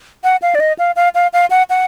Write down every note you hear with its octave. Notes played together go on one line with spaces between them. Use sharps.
F#5
F5
D5
D#5
F5
F5
F5
F5
F#5
F#5